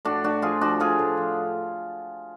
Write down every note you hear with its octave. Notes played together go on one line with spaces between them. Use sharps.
A2 D4 F#4
A2 D4 F#4
F3 F4 G#4
F3 D4 F#4
A2 F4 G#4
A2
F3